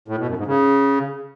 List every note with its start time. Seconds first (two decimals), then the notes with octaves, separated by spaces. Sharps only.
0.08 A2
0.18 B2
0.27 F#2
0.37 G#2
0.46 C#3